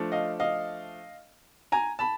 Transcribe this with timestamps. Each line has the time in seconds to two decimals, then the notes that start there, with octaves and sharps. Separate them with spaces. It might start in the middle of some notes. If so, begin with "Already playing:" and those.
Already playing: F3 A3 D4
0.12 D#5 F5
0.40 D#5 F5
1.72 G#5 A#5
1.99 A5 B5